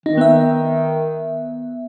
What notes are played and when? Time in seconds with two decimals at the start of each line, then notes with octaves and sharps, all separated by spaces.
0.06 D#3 D#4
0.18 B3 E5